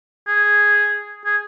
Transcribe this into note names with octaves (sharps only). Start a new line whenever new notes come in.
G#4
G#4